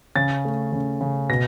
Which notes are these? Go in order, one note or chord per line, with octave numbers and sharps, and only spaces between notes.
C#3 A6
A3
C#3
C#3
B2 A#6